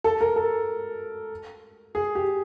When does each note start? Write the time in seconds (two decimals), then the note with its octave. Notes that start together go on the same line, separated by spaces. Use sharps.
0.04 A4
0.21 A#4
0.36 A4
1.95 G#4
2.15 G4